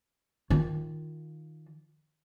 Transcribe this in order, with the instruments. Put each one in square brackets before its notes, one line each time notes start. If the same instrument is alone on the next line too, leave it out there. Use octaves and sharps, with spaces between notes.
[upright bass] D#3 F4